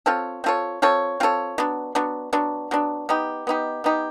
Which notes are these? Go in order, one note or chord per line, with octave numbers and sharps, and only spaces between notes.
C4 F4 A4 C#5
C4 F4 A4 C#5
C4 F4 A4 C#5
C4 F4 A4 C#5
F#3 B3 D4
F#3 B3 D4
F#3 B3 D4
F#3 B3 D4
B3 D#4 G4
B3 D#4 G4
B3 D#4 G4